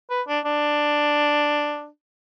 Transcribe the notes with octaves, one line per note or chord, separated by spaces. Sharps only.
B4
D4
D4